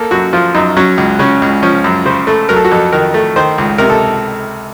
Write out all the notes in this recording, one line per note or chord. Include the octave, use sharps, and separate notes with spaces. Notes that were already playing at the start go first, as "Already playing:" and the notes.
Already playing: A#3 A4
F#2 F#4
F3 F4
F#2 D#4
F#3 C#4
C#2
C#3 C#4
C#2
F3 C#4
F#2
C#3 C5
A3
F#3 A#4
A4
F#4
F2 A4
D#3 A#4
A3
D#3 C5
C#2
C3 A#4
A4